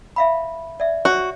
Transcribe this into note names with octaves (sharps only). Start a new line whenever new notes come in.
E5 F5 B5
D5 E5
F#4 C#5